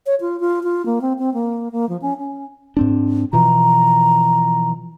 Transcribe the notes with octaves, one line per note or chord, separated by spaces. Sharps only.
C#5
F4
F4
F4
A#3
C4
C4
A#3
A#3
F3
C#4
C#4
G#2 C4 D4
B2 E3 F3 A#5